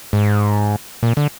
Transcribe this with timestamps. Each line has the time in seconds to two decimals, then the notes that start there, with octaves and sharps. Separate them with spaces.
0.13 G#2
1.03 A#2
1.17 D3